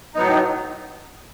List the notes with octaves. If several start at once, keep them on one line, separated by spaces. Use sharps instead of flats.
A2 F#3 B3 D#4